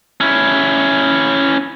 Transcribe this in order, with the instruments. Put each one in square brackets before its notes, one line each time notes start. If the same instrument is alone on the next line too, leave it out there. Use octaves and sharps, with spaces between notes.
[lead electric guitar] C#4 E4